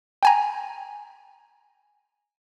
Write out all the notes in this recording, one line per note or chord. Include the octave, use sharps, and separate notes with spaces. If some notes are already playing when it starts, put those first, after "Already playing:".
G5 G#5 A#5